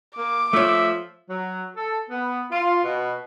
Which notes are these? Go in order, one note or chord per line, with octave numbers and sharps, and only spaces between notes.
A#3 D6
F3 A3 C#5 E5
F#3
A4
B3
F4
B2